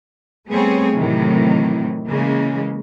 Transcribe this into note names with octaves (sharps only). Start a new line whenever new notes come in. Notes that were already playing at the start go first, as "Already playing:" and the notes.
G3 A3 B3 C4 G#4 C#5
A2 C3 D#3 E3 F#3
C#3 E3 G#3 A#3